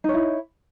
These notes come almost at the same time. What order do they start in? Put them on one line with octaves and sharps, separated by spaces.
D#4 C#5 E4